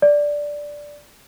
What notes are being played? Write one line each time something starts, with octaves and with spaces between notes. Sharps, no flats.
D5